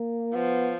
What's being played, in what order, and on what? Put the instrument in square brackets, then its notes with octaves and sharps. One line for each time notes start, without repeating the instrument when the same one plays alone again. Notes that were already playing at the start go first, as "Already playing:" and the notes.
Already playing: [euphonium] A#3
[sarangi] F3 [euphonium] B3